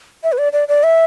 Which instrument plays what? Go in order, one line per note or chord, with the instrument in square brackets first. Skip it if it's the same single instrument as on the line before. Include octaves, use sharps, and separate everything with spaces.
[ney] E5
B4
D5
D5
D5
E5